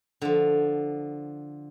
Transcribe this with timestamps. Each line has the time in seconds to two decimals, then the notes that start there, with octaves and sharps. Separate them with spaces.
0.22 D3 F3